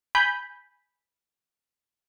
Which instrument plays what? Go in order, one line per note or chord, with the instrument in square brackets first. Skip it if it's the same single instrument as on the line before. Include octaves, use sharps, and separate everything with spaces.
[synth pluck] G#5 B5 G6